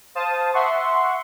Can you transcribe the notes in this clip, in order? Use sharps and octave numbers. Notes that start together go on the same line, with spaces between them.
C5 F5 A5 D#6
E5 F#5 C6 C#6